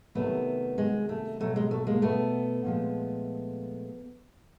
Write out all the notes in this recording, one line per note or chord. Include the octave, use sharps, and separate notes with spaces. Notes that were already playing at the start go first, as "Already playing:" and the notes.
C3 D#3 F#3 A3 B3
G#3
A3
B2 F#3 A3
G#3
A3
G#3 A#3
A3 B3
A#2 F3 G#3